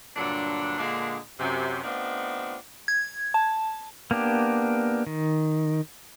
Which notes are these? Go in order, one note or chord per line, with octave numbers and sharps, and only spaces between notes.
G2 A#2 D3 F#3 D4
A#2 D3 G#3 A#3 D4
F#2 C3
A3 B3 C4 D4 D#4 F4
G#6
A5
A#3 B3 D4 G4
D#3